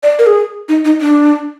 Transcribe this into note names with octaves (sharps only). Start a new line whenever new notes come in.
D5
A#4
G#4
D#4
D#4
D4